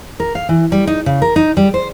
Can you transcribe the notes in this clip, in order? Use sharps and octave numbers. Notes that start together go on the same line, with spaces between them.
A#4
F5
E3
G3
D#4
C#3
A#4
D#4
G3
C5